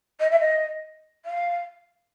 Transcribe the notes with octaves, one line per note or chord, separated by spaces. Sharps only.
D#5
E5
D#5
F5